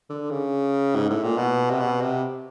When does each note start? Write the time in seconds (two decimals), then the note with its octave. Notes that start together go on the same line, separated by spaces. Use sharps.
0.09 D3
0.31 C#3
0.95 G#2
1.10 A2
1.23 A#2
1.37 B2
1.70 C3
1.80 B2
2.01 C3